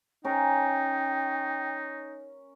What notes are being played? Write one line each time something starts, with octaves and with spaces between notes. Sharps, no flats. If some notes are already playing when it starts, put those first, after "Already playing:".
C#4 D#4 A#4 G5